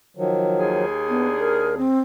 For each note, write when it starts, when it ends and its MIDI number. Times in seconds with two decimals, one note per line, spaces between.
0.17 0.85 51
0.17 0.85 53
0.17 0.85 54
0.58 1.89 39
0.58 1.89 68
1.09 1.27 59
1.09 1.78 62
1.38 1.75 70
1.78 2.00 60